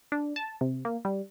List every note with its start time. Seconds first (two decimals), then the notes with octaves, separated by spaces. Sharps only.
0.12 D4
0.36 A5
0.61 C3
0.85 A#3
1.05 G3